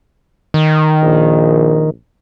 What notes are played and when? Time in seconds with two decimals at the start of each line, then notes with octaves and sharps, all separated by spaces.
0.54 D#3
1.02 A#1